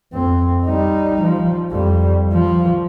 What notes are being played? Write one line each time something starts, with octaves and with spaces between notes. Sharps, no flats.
F2 C4
G3 D#4
F3
F2 G3
F3